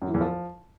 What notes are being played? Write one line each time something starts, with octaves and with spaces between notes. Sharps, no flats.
F#2
E3
E2
F3